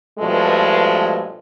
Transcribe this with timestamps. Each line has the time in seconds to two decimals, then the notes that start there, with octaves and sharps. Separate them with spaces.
0.19 G2 B2 F3 G#3 A3